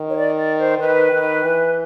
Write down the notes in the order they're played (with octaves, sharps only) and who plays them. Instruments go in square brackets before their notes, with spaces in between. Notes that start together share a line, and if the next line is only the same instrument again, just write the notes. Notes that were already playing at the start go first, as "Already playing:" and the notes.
Already playing: [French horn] D#3
[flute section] C#5
D5
D5
C5
[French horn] D#3 [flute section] B4
[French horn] D#3
E3